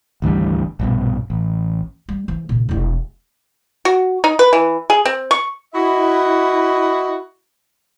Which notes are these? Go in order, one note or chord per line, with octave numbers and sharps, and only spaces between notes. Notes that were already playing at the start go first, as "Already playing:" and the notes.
G#1 D2 E3 G3
A#1 G2 B2
A1
G3
E3 F3
A#2 C#3
E1 E4
F#4
D#4
B4
E3
G#4
C4
C#6
E4 F#4 D#5